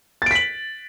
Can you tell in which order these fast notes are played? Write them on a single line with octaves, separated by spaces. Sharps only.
A6 D7 B6 F#7